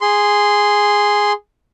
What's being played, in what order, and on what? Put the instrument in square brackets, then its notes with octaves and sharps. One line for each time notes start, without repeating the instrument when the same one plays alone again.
[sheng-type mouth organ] G#4 C6